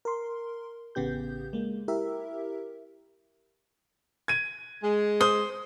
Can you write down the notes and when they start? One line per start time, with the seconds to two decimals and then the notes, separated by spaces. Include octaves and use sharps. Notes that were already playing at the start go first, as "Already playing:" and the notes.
0.05 A#4 C6
0.95 A1 C#3 B3 G4 G6
1.53 G#3 A#3
1.88 E4 G4 A#4 E5
4.28 G#6 D#7
4.83 G#3
5.21 C5 D#6